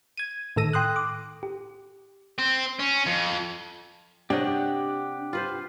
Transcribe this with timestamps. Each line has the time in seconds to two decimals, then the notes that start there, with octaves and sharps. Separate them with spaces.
0.17 G#6 D#7
0.56 A2 D#3 A4 E6 A#6 D#7
0.73 G5 C6 D#6 F#6
0.96 D6
1.43 G4
2.39 C4
2.80 C#4
3.07 F2
4.30 C3 D4 G4 C#5 D#5 F#5
5.33 F4 B4 C5